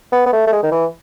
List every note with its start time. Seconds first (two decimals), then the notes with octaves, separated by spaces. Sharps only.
0.12 B3
0.26 B3
0.33 A3
0.47 A3
0.52 G#3
0.63 D#3
0.71 E3